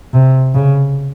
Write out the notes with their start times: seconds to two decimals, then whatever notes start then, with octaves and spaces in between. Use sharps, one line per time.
0.13 C3
0.55 C#3